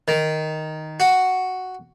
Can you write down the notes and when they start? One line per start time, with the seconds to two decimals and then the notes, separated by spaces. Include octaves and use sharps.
0.08 D#3
1.00 F#4